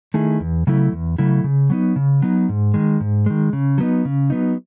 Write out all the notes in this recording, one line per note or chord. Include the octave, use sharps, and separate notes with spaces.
D#3 A3 E4 G#4
E2
C#3 F#3 A3 E4
E2
C#3 F#3 A3 E4
C#3
F#3 B3 D#4
C#3
F#3 B3 D#4
G#2
D#3 G#3
G#2
D#3 G#3
C#3
F#3 B3 D#4
C#3
F#3 B3 D#4